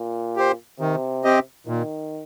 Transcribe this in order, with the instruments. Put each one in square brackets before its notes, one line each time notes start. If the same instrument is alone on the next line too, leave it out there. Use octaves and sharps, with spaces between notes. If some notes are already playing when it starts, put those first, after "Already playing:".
Already playing: [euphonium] A#2
[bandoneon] G4 C5
[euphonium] C3 [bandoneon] D#3
[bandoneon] C4 G4 D#5
[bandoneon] A#2 [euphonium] D#3